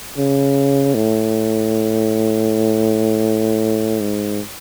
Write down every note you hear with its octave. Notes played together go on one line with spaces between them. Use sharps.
C#3
A2
G#2